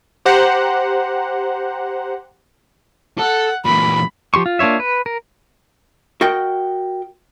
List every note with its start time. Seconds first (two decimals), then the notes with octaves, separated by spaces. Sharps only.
0.25 G4 C5 F#5 A#5
3.19 A4 F#5
3.65 A#2 E3 B5
4.34 F3 G4 C6 C#6
4.46 F4
4.59 A#3 D4 F4 C#5 E5
4.80 B4
5.06 A#4
6.21 F#4 A#4 D#5 F#5 G5